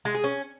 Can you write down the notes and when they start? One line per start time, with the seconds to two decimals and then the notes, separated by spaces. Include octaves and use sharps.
0.05 G#3
0.15 G#4
0.24 C#4